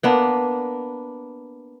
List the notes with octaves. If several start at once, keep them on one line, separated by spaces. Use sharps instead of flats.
A#3 B3 D4